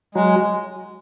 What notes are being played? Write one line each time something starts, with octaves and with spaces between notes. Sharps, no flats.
F#3 G#3